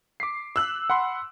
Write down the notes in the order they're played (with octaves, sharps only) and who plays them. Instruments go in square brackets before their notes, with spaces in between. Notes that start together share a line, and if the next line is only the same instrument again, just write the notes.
[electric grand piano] D6 B6 C7
[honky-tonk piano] E6 F#6
[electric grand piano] F#5 B5 C6